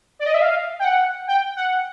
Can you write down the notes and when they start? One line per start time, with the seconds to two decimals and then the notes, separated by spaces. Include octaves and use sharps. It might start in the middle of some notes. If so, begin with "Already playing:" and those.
0.19 D5
0.26 D#5
0.34 E5
0.42 F5
0.79 G5
0.84 F#5
1.28 G5
1.56 F#5